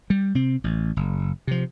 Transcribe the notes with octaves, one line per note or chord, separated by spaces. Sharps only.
G3
C3 C4
A1
F#1
C3 F3